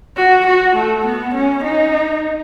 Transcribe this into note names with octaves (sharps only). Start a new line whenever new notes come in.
F#4
F#4
A3
B3
C#4
D#4